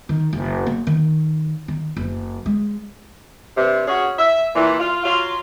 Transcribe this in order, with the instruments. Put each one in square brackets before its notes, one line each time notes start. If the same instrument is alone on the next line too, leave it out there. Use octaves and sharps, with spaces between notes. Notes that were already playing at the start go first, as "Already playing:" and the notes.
[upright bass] D#3
F#1
A#3
D#3
D#3
F#1
G#3
[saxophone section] G2 C3
C#4 F#4 G#4
E5
A#2 E3
F4
F#3 F4